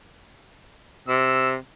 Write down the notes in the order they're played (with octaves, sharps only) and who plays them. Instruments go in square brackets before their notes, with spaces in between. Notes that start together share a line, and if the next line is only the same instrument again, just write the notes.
[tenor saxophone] C3 [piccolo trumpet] E6